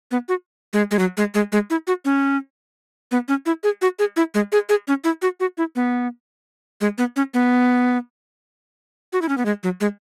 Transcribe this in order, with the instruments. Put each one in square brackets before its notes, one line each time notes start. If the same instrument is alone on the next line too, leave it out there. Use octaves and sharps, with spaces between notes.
[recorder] B3
F#4
G#3
G#3
F#3
G#3
G#3
G#3
E4
F#4
C#4
B3
C#4
E4
G#4
F#4
G#4
E4
G#3
G#4
G#4
C#4
E4
F#4
F#4
E4
B3
G#3
B3
C#4
B3
F#4
E4
C#4
B3
G#3
F#3
G#3